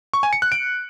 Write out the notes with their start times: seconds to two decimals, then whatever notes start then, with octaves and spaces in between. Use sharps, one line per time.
0.13 C#6
0.23 G#5
0.33 C#7
0.42 F#6
0.52 D7